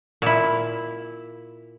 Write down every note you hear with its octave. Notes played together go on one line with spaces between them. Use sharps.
A#2 E4